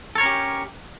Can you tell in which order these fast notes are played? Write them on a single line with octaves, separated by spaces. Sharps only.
A4 C#5 A#4 C#4 G4